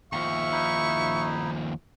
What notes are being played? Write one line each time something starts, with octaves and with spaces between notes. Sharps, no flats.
D#2 F3 E5 C#6
D#4 E4